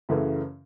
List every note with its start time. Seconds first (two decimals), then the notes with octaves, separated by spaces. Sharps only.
0.09 F#2 C#3 E3 A3